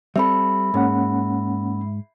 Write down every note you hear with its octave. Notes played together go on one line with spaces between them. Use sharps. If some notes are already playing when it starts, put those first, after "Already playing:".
G3 C4 A4 E5 B5
G#2 A#3 C#4 F#5